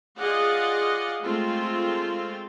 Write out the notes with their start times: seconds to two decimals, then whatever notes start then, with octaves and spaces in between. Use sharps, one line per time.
0.18 F4 G#4 D5 D#5 F5 F#5
1.22 G#3 A3 C4 F4